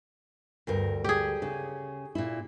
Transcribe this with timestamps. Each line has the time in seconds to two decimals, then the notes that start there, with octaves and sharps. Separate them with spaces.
0.67 D2 G2 A#4
1.04 G4 G#4
1.42 C#3
2.15 A#2 E4